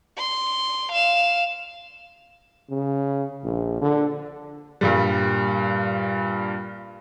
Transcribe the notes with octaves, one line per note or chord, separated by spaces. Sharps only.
C6
F5 E7
C#3
A#1
D3
G2 A#2 G3